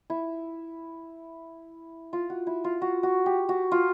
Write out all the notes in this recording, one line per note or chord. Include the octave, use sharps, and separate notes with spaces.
E4
F4
F#4
E4
F4
F#4
F#4
G4
F#4
F4